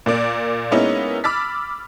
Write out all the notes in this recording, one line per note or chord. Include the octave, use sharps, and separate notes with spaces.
A#2 A#3 D5 D7
G#3 A#3 B3 C#4 D#4 E4
B5 D6 E6 F6 A6 B6